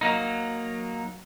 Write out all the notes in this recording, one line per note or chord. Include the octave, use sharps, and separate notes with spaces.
F#3 A#3 D#4